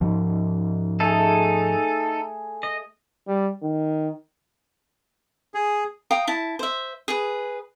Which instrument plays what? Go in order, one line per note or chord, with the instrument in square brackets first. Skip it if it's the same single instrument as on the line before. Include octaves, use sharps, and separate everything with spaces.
[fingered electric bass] G#2 F3
[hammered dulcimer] A3 G#4 [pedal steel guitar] D#4 A4
[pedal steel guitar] D#5
[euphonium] G3
D#3
[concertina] G#4
[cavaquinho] F5 G5 A#5 D#6
E4 A5
C5 E5
G#4 B4